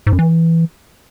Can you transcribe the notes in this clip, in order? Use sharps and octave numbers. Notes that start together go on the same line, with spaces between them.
G#2
F#2
E3